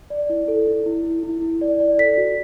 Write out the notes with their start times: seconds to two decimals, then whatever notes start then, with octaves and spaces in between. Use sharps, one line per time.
0.10 D5
0.30 E4
0.48 A4
0.67 E4
0.86 E4
1.05 E4
1.23 E4
1.42 E4
1.61 D5
1.80 D5
1.98 A4 B6
2.17 F#4